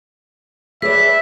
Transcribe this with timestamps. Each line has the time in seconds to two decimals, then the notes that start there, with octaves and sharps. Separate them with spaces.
0.82 G#4 B4 C#5 D5 E5 B6